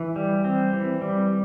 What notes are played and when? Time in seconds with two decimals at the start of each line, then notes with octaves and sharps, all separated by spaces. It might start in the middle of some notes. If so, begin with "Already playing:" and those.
Already playing: E3
0.16 G3
0.45 C4
0.73 E3
1.01 G3